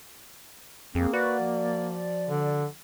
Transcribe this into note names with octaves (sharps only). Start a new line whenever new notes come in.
F2 A#3 C4 G#4
F#4 B4 D5
F3
D3